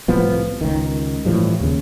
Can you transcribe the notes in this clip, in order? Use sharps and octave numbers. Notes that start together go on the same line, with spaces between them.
C2 A2 F3 B3
C#2 D#3
A2 E3 F3 G3
D#2 C#3